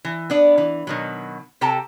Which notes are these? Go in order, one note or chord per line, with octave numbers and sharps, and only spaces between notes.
E3
B3 D4 D5
E3
B2 D#3 F#3
C3 G4 A4 G5 A5 A#5